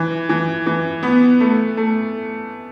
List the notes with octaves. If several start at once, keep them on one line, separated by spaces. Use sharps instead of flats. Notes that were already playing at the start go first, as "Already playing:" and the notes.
Already playing: E3
E3
E3
B3
A3
A3